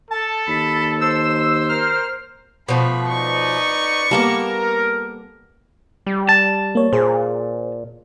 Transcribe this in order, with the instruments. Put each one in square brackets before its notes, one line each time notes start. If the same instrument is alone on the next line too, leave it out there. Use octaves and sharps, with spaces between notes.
[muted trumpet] A4 [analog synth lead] A5
[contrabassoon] D#2 [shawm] B5
[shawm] C5 [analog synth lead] E6
[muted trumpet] A#4 [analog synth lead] F6
[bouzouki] B2 F3 A3 [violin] B5
[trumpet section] D#4 B4 D5 [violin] C#6
[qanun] G3 A#3 B3 [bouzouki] A4 [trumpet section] A#4
[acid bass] G3
[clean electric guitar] A5
[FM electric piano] A#3 C#5
[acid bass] A#2 [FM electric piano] G#4 C5